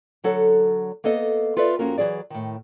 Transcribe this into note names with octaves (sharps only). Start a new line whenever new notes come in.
D3 F#3 A4 F#5
A#3 B3 A4 D#5
F4 A4 B4 D5 E5
F2 A#3 C#4 F#4 A#4
E3 F#3 G#4 D5
A2 D#3